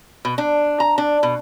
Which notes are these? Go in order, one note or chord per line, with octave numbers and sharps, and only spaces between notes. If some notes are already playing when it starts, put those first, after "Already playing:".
B2
D4
A#5
D4
B2